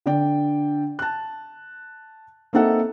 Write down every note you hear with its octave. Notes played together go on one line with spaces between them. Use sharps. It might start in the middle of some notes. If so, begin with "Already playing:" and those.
D3 D5 G5
A5 F#6
A#3 C4 D#4 A4 E5 F#5